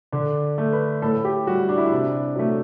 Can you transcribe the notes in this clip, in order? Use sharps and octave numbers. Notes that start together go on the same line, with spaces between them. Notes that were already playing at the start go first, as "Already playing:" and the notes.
D3 D4
A3
B4
A2 A4
G4
G3 F#4
D4
E4
D4
C3
F#3 A3